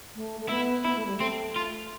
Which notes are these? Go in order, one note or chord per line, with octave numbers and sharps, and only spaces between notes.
A3
A3
B3 E4
B3 E4
A3
G3
A3 C4
F4